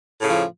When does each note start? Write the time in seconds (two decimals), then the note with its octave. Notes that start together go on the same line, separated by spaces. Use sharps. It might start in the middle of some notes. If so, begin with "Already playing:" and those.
0.20 A2
0.24 C#3
0.28 F3